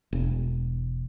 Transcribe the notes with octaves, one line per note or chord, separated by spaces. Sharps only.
E1